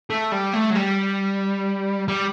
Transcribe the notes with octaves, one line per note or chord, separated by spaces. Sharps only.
A3
G3
A3
F#3
G3
G3